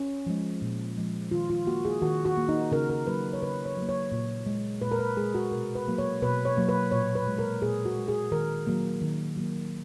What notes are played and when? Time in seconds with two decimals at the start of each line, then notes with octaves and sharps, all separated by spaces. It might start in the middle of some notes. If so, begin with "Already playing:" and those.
Already playing: C#4
0.26 F3 G#3
0.62 A#2
0.97 F3 G#3
1.31 D#3 F4
1.50 F4
1.66 A#3 F#4
1.85 G#4
2.02 D#3 F#4
2.25 F#4
2.37 A#3
2.49 D#4
2.72 C#3 A#4
2.90 A#4
3.07 F#3 A#3 B4
3.33 C#5
3.42 C#3 B4
3.65 C#5
3.77 F#3
3.82 A#3
3.89 C#5
4.12 A#2
4.46 G#3
4.82 A#2 B4
4.92 A#4
4.99 B4
5.17 G#3 G#4
5.35 F#4
5.51 B2 A#4
5.75 B4
5.87 F#3 A#3
5.98 C#5
6.22 B2 B4
6.45 C#5
6.57 F#3 A#3
6.69 B4
6.91 A#2 C#5
7.15 B4
7.27 G#3
7.39 A#4
7.62 A#2 G#4
7.85 F#4
7.97 G#3
8.08 G#4
8.32 D#3 A#4
8.67 F#3 A#3
9.02 D#3
9.37 F#3 A#3